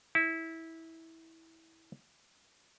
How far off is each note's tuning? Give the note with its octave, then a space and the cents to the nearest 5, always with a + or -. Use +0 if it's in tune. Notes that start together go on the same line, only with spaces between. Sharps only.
E4 -20